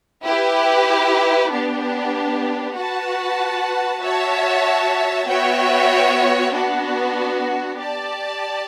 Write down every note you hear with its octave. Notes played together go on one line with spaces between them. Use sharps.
E4 G4 B4
B3 D4 G4
F#4 B4 F#5 A5
F#4 C#5 E5 A5
B3 F#4 C#5 E5 G5
B3 D4 F#4
G4 D5 A5